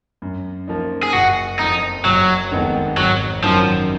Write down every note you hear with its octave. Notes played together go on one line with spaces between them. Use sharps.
F#2
F3 A#3 D#4
G#4
F#1 F#4
F2 F3 D#4
F#1 F#3
F2 D#3 G#3 B3
G#1 F#3
F#2 D#3 F3 F#3